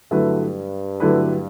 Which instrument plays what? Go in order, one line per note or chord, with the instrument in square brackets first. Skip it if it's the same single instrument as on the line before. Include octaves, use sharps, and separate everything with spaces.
[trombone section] G2 [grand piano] D3 F#3 A3 E4 B4
[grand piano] D3 F#3 A3 E4 B4